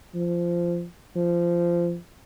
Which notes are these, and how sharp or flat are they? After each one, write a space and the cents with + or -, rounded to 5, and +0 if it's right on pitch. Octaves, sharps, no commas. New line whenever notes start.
F3 -15
F3 -20